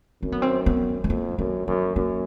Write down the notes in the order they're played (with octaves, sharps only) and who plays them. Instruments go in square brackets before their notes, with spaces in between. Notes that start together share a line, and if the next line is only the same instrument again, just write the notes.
[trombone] F#2 [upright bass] C4
[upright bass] B3
C4
B3
A3
[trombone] F2 [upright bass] A#3
[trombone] F#2 [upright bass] A#3
[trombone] F#2 [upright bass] A#3
[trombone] F#2 [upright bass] A#3